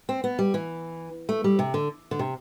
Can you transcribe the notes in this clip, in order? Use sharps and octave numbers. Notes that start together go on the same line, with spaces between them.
C4
B3
G3
E3
A3
G3
C3
D3
D3
C3